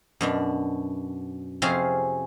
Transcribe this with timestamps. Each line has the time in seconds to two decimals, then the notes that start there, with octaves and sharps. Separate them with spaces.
0.21 F#2 B2 D4
1.62 F2 C3 C4 C#4 G#4 F5